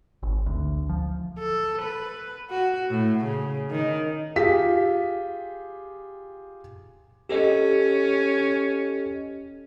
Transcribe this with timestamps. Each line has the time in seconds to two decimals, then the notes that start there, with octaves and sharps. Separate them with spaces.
0.23 G#1
0.46 D2
0.89 F3
1.39 A4
1.81 B4
2.50 F#4
2.90 A2
3.24 C#3
3.70 D#3
4.36 F4 G4 G#4 B6
7.29 C#4 G4 A4 D#5